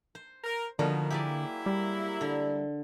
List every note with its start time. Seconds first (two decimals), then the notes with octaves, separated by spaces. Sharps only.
0.15 C5
0.44 A#4
0.79 B2 D3 D#3 F3 A#3 F#4
1.10 F#3 A#3 E4 G4 G#4 D5
1.66 G3
2.21 D3